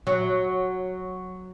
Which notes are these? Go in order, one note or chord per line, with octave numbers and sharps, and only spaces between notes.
F#3